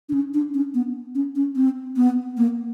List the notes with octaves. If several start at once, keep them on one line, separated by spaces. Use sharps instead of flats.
D4
C#4
D4
C#4
B3
C#4
C#4
C4
B3
A#3